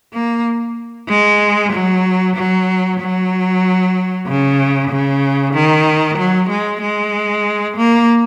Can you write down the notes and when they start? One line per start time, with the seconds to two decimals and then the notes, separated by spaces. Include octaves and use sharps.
0.13 A#3
1.09 G#3
1.73 F#3
2.36 F#3
3.00 F#3
4.27 C#3
4.90 C#3
5.54 D#3
6.18 F#3
6.49 G#3
6.82 G#3
7.77 A#3